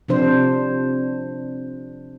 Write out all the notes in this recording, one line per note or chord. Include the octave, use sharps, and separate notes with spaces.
C3 F3 D4 C5